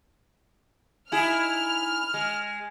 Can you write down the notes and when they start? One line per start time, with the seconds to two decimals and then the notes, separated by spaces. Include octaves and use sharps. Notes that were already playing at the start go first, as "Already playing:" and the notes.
1.12 D#4 E4 G#4 F6
2.14 G#3